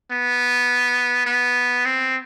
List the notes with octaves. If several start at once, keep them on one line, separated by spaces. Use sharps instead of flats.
B3
B3
C4